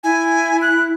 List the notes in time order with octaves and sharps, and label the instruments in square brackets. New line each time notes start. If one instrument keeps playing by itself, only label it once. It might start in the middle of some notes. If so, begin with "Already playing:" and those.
[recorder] E4 [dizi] G#5
[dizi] F#6